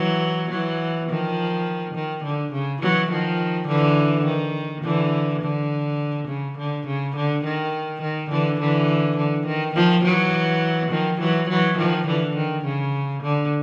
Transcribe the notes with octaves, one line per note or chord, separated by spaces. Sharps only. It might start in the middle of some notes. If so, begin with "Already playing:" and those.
Already playing: E3 F#3
E3 F#3
D#3 F3
D#3
D3
C#3
E3 F#3
D#3 F3
D3 E3
D#3
D3 E3
D3
C#3
D3
C#3
D3
D#3
D#3
D3 E3
D3 E3
D3
D#3
D#3 F3
E3 F#3
D#3 F3
E3 F#3
E3 F#3
D#3 F3
D3 E3
D#3
C#3
D3